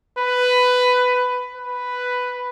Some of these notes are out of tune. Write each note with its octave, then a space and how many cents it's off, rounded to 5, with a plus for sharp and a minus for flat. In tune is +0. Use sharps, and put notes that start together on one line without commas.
B4 +10
B4 +5